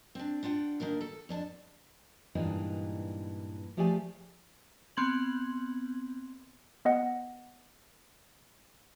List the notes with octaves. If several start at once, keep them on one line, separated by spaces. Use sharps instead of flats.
C4 D4
D4 F4 F#5 G5
D#3 A#3 D4 A#4
A4
F2 D4 A5
G2 A#2 E3 G#3 D4 D#4
F3 A3 G4 G#4 D5 G#5
B3 C4 C6 G#6 F#7
B3 D#5 F#5